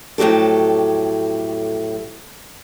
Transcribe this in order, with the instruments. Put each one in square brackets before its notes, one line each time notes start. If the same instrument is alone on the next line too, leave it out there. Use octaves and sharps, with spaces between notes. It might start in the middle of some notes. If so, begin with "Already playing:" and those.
[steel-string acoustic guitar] F2 A2 F#3 G4 A4